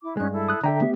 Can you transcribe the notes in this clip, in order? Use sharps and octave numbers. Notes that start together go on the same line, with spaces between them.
E4 D6
G2 G#3 C#4 D#4 F#6
E4 A4
D#6 F#6
D3 A4 E5 G5 A#5
A3 B3 G4